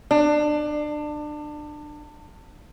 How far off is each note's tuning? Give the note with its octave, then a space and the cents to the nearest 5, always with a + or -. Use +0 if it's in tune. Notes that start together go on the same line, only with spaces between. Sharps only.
D4 +25